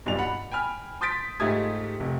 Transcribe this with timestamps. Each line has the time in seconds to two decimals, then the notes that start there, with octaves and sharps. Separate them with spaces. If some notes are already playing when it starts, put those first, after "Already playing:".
0.06 B1 G2 A#2 D5 F7
0.19 F#5 B5
0.51 G5 G#5 B5 F6
1.01 C6 D#6 G6 A6 B6 D7
1.40 G#2 A3 F4 G4 D#6 G#6
2.00 F1